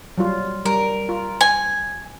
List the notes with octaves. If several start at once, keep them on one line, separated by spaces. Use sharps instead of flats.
F#3 G3 F4
G3 A#4
F4
G#5